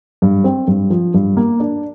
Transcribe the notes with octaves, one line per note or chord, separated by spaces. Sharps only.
G2
C4
G2
F3
G2
A#3
D4